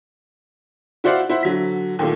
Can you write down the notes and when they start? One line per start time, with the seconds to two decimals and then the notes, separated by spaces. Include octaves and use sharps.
1.04 E4 F#4 C5 D5 F5 F#5
1.29 E4 C5 F#5
1.43 D3 F#3 B6
1.99 D#2 A#2 D#3 A3 A#3